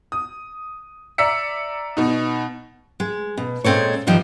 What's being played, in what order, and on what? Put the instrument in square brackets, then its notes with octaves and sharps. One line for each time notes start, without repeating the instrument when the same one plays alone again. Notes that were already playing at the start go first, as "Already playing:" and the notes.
[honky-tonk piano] D#6
D5 E5 A#5 E6 B6 C#7
B2 D#4
[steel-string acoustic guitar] G#3
B2
A#2 G#3 C4 A4 C#5
G2 D#3 F3 G3 D#4